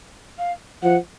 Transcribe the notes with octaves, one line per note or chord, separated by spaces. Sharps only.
F5
F3 F#5